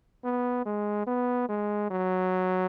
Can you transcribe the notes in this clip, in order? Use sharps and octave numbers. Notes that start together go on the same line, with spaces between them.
B3
G#3
B3
G#3
F#3